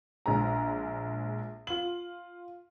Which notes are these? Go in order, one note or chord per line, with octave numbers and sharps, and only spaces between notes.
A#1 G#3 A#5
F4 F#7